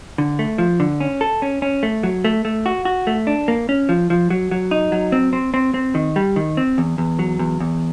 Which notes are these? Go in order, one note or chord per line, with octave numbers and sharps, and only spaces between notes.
D3
A3
F3
D3
C#4
A4
C#4
C#4
A3
F#3
A3
A3
F#4
F#4
A3
D4
A#3
C#4
F3
F3
F#3
F#3
D#4
F#3
C4
C4
C4
C4
D#3
G3
D#3
C4
E2
E2
F#3
E2
E2